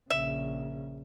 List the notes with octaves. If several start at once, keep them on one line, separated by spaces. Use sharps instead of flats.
A#1 C#3 E5